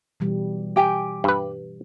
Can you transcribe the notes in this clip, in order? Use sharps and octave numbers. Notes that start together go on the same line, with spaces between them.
B2 E3 G3
G4 G5 G#5
G2 B4